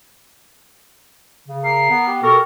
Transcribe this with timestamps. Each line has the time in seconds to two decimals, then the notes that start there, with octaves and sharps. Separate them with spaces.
1.48 C#3
1.64 A#4 C7
1.90 B3
2.07 G4
2.23 B2 A4 A#4 C#6